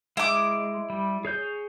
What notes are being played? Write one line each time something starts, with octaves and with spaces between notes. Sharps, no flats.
G#3 E4 D6
G3
G#4 C#5 G6